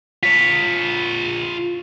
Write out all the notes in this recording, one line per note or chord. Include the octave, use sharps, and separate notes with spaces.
F4 C#5 B6